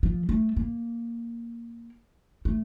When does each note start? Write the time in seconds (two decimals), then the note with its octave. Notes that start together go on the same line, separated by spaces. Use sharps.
0.03 F3
0.29 A3
0.57 A#3
2.45 A3